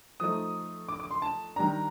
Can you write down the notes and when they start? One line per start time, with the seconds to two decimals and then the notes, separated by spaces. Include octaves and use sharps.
0.20 F3 A3 D#4 D#6
0.89 D6
1.00 D6
1.11 C6
1.22 A5
1.56 D#3 G3 D4 A#5